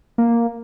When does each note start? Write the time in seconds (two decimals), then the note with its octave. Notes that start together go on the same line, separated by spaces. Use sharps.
0.18 A#3